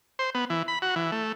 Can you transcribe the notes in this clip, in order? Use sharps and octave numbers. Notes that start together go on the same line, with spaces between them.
C5
B3
E3
B5
F#4
E3
A3